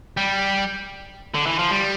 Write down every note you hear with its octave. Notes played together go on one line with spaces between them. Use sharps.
G3
D3
E3
F3
G3